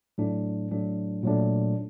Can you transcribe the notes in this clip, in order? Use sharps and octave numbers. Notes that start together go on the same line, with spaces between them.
A2 F#3 A3 D4
A2 F#3 A3 D4
A#2 F#3 A3 D4